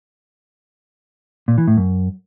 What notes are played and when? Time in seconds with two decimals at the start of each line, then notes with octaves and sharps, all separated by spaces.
1.48 A#2
1.58 E3
1.67 A2
1.77 F#2